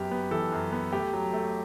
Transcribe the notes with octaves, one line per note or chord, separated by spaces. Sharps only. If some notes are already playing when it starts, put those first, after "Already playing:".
Already playing: F#2 B3 G4
B3
E3 A4
F#2
B3
A3 G4
F#3
A3